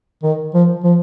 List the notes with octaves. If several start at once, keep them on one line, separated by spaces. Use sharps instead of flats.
D#3
F3
F3